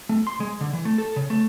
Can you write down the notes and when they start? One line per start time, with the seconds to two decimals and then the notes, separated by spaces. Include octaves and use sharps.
0.09 A3
0.27 C6
0.40 G#3
0.61 D3
0.73 E3
0.85 A3
0.98 A4
1.16 C#3
1.30 A3